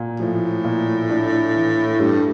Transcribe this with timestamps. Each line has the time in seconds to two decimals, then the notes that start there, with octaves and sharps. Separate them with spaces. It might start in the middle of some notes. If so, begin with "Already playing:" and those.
Already playing: A#2
0.20 A2 F3
0.64 A#2
1.09 D4
1.54 E3
2.00 G2 A3